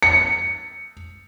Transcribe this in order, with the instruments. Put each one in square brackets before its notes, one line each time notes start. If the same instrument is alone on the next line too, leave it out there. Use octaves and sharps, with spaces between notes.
[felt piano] C#7